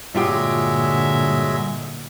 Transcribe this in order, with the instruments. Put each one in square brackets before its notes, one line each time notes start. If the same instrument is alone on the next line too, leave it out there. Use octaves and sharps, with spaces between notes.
[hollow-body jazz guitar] G2 F4 G4 [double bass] A#2 D3 [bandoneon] F#3 G#3 E5